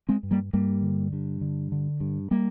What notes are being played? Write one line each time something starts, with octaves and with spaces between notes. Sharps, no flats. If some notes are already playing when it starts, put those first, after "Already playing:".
G#3 C4
G2
G3 A#3
G2 G3 A#3
D3
G2
D3
D3
G2
G3 A#3